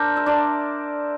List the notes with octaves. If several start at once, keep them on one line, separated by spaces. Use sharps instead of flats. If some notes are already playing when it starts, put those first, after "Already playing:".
Already playing: D4 A#4 C5 D5
E5
D4 D5